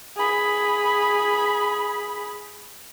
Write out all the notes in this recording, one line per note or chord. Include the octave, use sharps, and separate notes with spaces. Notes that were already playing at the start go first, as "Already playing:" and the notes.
G#4 B5